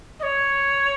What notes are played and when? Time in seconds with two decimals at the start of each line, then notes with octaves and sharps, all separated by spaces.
0.20 D#5
0.23 C#5